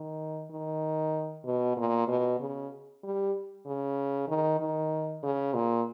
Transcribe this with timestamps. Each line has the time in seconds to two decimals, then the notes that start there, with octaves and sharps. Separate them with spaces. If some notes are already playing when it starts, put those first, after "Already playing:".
Already playing: D#3
0.50 D#3
1.45 B2
1.77 A#2
2.07 B2
2.40 C#3
3.03 G3
3.66 C#3
4.28 D#3
4.60 D#3
5.23 C#3
5.54 A#2